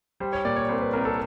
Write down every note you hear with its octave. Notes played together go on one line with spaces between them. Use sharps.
G3 C5
C#5
A#2 D5
C#5
C2 C5
B4
C2 A#4
A4